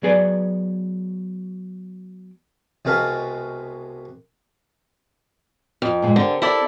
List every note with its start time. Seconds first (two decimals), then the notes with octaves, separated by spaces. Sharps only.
0.03 F#3 B3 G#4 B4 D5
2.85 C2 B2 G#3 B4 F5 A5
5.82 F2
6.02 G2 A#2 G#3
6.16 D3 C4 G4 A#4
6.42 E4 A4 D5